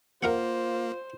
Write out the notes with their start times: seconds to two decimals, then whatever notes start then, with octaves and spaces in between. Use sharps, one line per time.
0.23 A#3 F4 A#4 C5 F5 F#5